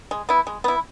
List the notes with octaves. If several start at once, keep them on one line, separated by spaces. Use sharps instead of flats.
G#3
B3 E4
G#3
B3 E4